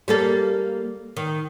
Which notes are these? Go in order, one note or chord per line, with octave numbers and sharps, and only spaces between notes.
G3 A#3 A4
D#3